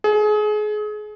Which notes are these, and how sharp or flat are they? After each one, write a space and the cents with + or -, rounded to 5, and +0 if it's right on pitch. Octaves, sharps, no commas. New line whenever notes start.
G#4 +30